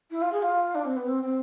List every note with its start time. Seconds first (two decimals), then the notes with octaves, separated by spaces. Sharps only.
0.10 E4
0.21 F4
0.32 G#4
0.42 F4
0.74 D4
0.84 C4
0.96 B3
1.07 C4
1.22 C4